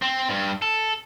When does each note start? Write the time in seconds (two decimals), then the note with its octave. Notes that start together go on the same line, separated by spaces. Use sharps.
0.02 C4
0.29 G2
0.62 A4